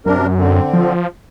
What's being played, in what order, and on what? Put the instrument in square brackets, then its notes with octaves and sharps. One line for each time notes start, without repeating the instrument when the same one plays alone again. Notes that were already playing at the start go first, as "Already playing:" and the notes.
[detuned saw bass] F#2 [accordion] C3 D4 A#4
[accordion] D3 C4
[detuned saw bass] F3